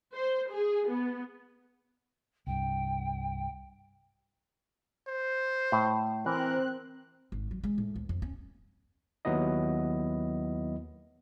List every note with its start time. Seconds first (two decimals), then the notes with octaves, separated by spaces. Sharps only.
0.13 C5
0.50 G#4
0.87 B3
2.47 C2 G2 G5
5.08 C5
5.72 A2
6.26 E3 C4 A#4 F#6
7.32 G#1
7.51 F#3
7.64 G#3
7.78 A2
7.96 D2
8.09 F2
8.22 C#4
9.25 D#2 F#3 B3 E4 D#5